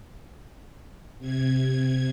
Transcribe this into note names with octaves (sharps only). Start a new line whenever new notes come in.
C3 G#6